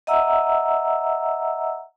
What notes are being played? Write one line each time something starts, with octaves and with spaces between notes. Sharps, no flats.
D#5 E5 F#5 A#5 E6